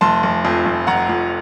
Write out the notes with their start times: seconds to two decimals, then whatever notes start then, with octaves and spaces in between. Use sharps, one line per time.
0.01 F1 A5 C6
0.23 F1
0.45 F2
0.65 F1
0.87 F1 F#5 A#5
1.09 F2